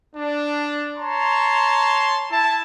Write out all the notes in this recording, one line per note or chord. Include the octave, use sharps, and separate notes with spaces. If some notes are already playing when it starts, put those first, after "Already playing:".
D4
C#5 A5 A#5 C6
E4 A5